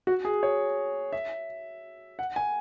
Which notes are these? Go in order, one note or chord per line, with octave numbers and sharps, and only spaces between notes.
F#4
G#4
C#5
E5
F#5
G#5